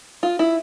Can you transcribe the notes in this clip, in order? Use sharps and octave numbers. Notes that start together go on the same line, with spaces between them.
F4
E4